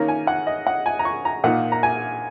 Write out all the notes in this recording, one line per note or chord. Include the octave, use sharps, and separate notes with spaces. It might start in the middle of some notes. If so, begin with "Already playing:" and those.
Already playing: D#3 A#3 C#4 A#5
G#5
F#5
D#5
F#5
G#5
A#5
C#6
A#5
A#2 A#3 D#4 F#5
A#5
G#5